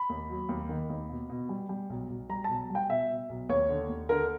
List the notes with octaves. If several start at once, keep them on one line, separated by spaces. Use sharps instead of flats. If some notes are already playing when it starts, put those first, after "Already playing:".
Already playing: B5
D#2
F#3
D#2
D#3
D#2
B2
B2
G3
G3
B1
B1
G3 A#5
B1 A5
G3
G5
B2 E5
B2
B1
D#2 C#5
D3
D#2
D3 A#4